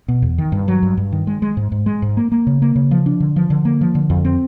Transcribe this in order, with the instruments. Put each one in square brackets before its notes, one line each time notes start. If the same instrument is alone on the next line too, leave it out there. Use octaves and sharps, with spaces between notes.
[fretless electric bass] B2
E2
D#3
G2
F#3
G2
G2
D#3
G#3
G#3
G#2
G#2
G#3
G#2
A#3
A#3
C#3
A#3
C#3
F3
D4
D3
F3
D3
A#3
F3
D3
F2
C4